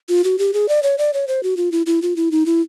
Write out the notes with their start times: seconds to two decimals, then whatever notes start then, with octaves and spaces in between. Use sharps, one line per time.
0.09 F4
0.24 F#4
0.39 G4
0.54 G#4
0.69 D5
0.83 C#5
0.98 D5
1.14 C#5
1.28 C5
1.43 F#4
1.57 F4
1.72 E4
1.86 E4
2.02 F4
2.16 E4
2.32 D#4
2.46 E4